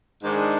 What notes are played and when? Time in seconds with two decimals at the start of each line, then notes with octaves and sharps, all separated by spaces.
0.21 G#2 D#3 G#3 D4